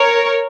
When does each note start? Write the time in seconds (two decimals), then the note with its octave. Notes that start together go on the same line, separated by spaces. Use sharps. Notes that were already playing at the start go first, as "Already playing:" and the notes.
Already playing: A#4 C#5